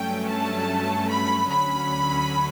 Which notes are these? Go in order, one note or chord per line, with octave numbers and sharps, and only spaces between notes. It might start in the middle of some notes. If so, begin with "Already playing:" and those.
Already playing: G2 F#3 A3 C#4 G5
A5
B5
D2 D3 F#3 C#4 B5